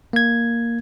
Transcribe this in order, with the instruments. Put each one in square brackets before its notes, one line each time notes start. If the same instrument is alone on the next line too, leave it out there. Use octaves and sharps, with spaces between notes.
[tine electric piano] A#3 G#6